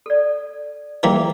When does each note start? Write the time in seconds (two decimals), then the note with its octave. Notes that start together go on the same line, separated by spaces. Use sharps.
0.06 A4 D5
1.03 E3 G3 A#3 G#4